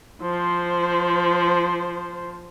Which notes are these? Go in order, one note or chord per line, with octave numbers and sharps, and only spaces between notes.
F3 C5